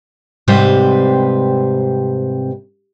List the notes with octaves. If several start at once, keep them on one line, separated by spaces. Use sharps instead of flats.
G#2 C3 G3 C4 B4 C5